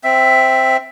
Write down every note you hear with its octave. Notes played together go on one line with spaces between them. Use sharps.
C4 E5